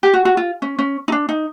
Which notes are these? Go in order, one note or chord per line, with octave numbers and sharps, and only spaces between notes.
G4
F#4
F#4
F4
C#4
C#4
D#4
D4
D#4